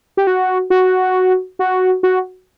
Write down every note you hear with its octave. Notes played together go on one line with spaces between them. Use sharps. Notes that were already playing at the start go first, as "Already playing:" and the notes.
G4
F#4
F#4
F#4
F#4